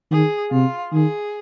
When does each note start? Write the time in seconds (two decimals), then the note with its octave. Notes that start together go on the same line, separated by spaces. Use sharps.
0.11 D#3 G#4
0.52 C3 F4
0.92 D#3 G#4